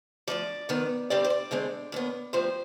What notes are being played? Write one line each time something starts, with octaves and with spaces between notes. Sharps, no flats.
D2 C3 F3 D5
F2 D#3 B3
G2 D3 G3 C4 D5
C5
D5
G2 D3 G#3 C4
D#2 D#3 B3
D2 C3 F3 C4 C5